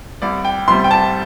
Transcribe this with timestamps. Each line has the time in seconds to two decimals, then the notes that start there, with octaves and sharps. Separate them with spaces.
0.22 C2 D5
0.45 G5
0.68 C3 G3 C6
0.84 G5
0.91 A5